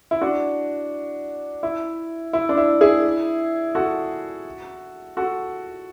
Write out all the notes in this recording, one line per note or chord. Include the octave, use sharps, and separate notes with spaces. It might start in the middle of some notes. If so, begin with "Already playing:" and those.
E4
D4 F#4
E4
E4
D4
E4
E4 G#4
F#4 A4
F#4 A4